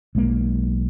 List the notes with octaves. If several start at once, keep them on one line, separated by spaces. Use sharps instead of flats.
B1 G#3 A#3